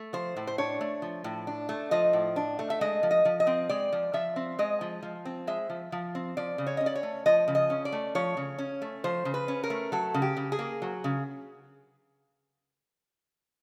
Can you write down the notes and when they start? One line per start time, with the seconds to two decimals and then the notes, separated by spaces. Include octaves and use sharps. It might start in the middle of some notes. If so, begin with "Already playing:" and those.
Already playing: A3
0.13 F3 C5
0.37 A2
0.47 C5
0.58 D4 C#5
0.81 A3
1.02 F3
1.24 A2
1.47 D4
1.69 A3
1.91 F3 D#5
2.13 A2
2.36 D4
2.59 A3
2.70 E5
2.81 G#3 D#5
3.03 F3
3.11 D#5
3.25 F3
3.40 D#5
3.47 C4
3.69 G#3 D5
3.92 F3
4.13 F3 E5
4.36 C4
4.59 G#3 D#5
4.81 F3
5.03 F3
5.25 C4
5.47 G#3 E5
5.70 F3
5.92 F3
6.15 C4
6.37 F3 D5
6.58 C#3
6.67 C#5
6.77 C#4 D#5
6.86 D5
6.95 C#5
7.03 A3
7.26 F3 D#5
7.48 C#3
7.55 D#5
7.70 C#4
7.85 D5
7.92 A3
8.15 F3 C#5
8.37 C#3
8.58 C#4
8.82 A3
9.04 F3 C5
9.25 C#3
9.34 B4
9.48 C#4
9.63 A#4
9.70 A3
9.92 F#3 A4
10.14 C#3
10.22 G4
10.37 C#3
10.52 G#4
10.59 A#3
10.82 F#3
11.04 C#3